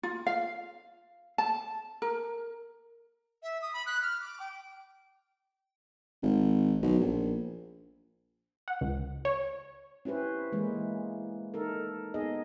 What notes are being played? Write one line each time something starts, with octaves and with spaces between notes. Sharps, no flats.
F4
F5
A5
A#4
E5
D#6
B5
F#6
F6
D6
G5
G#1
B1
A#1
F#5
C#2
C#5
C#4 E4 G4 B4 C5
E3 G#3 A#3
D#4 A4 A#4
B3 D#4 G#4 D#5